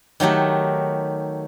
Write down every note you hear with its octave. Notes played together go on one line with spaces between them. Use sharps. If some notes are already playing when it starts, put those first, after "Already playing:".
D#3 F#3 A3 G4